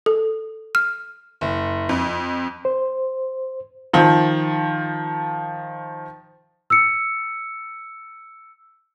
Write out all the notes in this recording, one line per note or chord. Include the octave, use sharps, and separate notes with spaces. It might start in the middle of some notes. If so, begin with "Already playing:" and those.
A4
F6
F#1
F2
C5
D#3 F3
E6 C#7